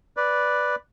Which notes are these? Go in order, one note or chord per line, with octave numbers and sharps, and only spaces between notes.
B4 D5